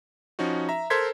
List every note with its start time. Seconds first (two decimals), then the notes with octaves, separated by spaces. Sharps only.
0.39 F3 C#4 D#4 F#4
0.69 E5 A#5
0.90 A4 A#4 C5 C6 G#6 B6